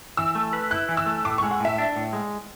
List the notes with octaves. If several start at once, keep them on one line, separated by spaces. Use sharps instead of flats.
E3 E6
A3
B4
E4 F#6
E3
E6
A3
A2 D6
C#6
G#3
F#5
A2 E5
D4
A2
G#3